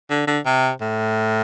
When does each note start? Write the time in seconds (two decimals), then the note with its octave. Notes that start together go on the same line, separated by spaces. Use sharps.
0.10 D3
0.27 D3
0.46 C3
0.81 A2